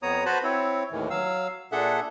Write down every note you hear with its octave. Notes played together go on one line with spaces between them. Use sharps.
F2 B3 C#5 A#5 D#6
F#4 B4 C5 A5 B5
C4 E4 C#5
D#2 A2 D#3 E3
F#3 F5 E6
A#2 D4 G#4 A4 E5 F#5